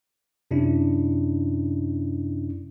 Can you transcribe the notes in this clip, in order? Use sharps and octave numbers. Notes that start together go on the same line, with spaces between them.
F#2 C3 C#4 D4 E4